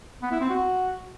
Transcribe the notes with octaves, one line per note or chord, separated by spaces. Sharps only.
B3
E4
C4
F#4